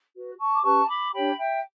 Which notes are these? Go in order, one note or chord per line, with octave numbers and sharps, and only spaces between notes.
F#4 B4
A5 C#6
D6
C#4 G4 B4 A5 C#6
B5 D6
D4 G4 C#5 G5 B5
E5 G5